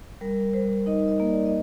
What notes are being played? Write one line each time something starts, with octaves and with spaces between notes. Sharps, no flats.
G3 A#4
G3 C5
D#4 D#5
D#5
A#3
D5
D#5